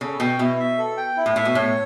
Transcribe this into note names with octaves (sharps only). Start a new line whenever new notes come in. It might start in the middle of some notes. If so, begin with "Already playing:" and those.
C#3 A4
B2 G5
B2 E4
E5
A4
G5
E4
A2
A2 E5
B2
A2 C#5